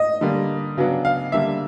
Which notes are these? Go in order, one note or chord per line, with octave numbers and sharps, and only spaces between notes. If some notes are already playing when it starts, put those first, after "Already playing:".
Already playing: D#5
D3 G3 A#3
C#3 F#3 B3 D4
F5
D3 G3 A#3 D4 E5